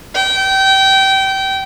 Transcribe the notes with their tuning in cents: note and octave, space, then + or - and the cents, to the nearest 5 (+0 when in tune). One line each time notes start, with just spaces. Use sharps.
G5 -25